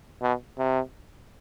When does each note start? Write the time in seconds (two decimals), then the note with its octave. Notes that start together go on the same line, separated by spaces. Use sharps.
0.22 B2
0.58 C3